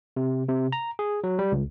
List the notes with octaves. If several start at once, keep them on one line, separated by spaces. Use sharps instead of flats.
C3
C3
A#5
G#4
F#3
G3
C#2